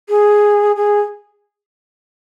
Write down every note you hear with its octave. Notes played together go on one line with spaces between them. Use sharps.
G#4
G#4